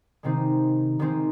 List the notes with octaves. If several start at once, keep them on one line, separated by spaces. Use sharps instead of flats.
C3 D#3 G#3 C4 D#4
C3 D#3 G#3 C4 D#4